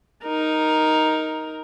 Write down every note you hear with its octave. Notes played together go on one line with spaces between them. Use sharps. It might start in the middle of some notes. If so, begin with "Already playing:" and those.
D#4 A#4